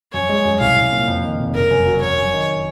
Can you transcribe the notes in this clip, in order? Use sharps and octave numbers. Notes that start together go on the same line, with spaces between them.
F#2 C#5
G#3
F#2
C2 F5
C2
A#2
F2
D#3
F1
F#1 A#4
F#2
F#3
F#2 C#5
F#2
D#3